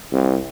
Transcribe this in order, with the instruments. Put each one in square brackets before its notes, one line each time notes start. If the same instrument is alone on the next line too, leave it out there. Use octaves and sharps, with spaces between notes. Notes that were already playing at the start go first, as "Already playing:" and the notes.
[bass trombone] C2